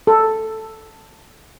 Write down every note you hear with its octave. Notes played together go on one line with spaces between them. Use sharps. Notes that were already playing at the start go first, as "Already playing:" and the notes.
A4